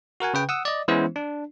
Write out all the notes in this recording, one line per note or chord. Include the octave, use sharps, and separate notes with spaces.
F#4 A#4 F#5 G#5
C#3 B4 G5
F#5 D#6 E6
D5 D#5
E3 G#3 B3 C#4 E4 C5
D4